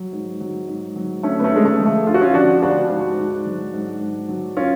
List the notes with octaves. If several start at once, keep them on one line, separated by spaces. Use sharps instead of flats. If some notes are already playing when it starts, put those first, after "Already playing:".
Already playing: F#3
G#2
F#3
G#2
F#3
D3 A3 C#4
B3
A3 C#4
D3 G#3
A3
F3
A3
D3 F4
F#4
C#4 F4
F3 D4 F#4
D2 D4 F#4
G#2
G#2
F#3
G#2
G#2
F#3
C#4 F4